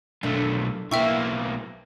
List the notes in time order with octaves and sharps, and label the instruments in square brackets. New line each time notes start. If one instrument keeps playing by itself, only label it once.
[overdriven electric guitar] B1 A3 [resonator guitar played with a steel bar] A2 A#3 D4
[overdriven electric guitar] B1 A#3 [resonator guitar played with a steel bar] E4 B4 [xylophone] E5 G5 C#6